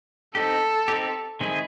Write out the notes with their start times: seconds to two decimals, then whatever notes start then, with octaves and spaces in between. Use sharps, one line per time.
0.35 C4 D#4 G4 A4
0.88 C4 D#4 G4
1.41 D#3 G#3 C4 E4 G#4